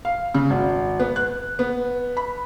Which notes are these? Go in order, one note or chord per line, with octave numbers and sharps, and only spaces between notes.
F5
C#3
G#1
B3
F#6
B3
B5